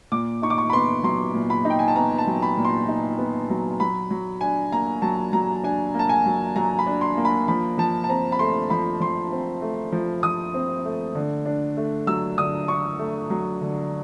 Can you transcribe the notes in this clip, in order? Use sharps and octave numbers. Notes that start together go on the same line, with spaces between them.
A#2 D6
D#4 C#6
D6
C#6
B5
B3 C6
F#3 C6
A#2
B5
D#4
G5
G#5
A5
B3 A#5
A5
F#3
B5
A#2
C6
D#4
B3
F#3
F#3 B5
F#3
D4 G#5
A#3 A#5
F#3 A5
F#3 A#5
D4 G#5
A#3
A5
G#5
F#3
F#3 A#5
B5
D4
C6
A#3
B5
F3 B5
F3 A5
A5
C4 A#5
B5
A3 C6
F3 B5
F3 C6
C4
A3
F3
F3 D#6
C4
A3
D3
D4
A3
F#3 E6
D3 D#6
D4 C#6
A3
F#3
D3